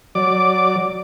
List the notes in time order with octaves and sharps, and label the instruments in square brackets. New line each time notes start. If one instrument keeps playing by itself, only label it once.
[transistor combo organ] F#3 D5 D6